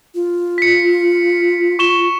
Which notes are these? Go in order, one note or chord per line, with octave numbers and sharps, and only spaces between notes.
F4
B6 C#7
C#6 E7 G7